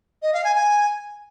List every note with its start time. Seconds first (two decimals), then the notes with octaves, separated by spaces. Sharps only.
0.22 D#5
0.33 F5
0.44 G#5
0.55 G#5